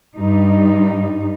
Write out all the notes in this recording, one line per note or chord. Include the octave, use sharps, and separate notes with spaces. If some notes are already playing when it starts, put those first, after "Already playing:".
G2 G3 D#4